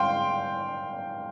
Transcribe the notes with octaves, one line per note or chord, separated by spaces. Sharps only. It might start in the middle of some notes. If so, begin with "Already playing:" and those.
Already playing: F5 G5 C6